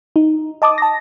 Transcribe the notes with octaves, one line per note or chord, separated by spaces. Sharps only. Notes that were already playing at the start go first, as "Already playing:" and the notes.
D#4
D#5 A5 D6 D#6
A5 A#6